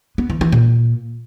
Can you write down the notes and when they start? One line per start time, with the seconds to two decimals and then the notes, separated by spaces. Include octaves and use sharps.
0.18 B3
0.30 E3
0.41 E3
0.52 A#2